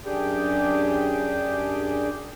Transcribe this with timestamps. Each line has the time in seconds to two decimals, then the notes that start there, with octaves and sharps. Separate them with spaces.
0.05 F#2 D4 G4 G#4 G5